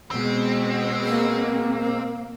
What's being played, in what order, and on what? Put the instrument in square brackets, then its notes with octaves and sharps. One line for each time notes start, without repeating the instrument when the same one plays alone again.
[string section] B2 G#3 [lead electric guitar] C4
[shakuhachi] A#3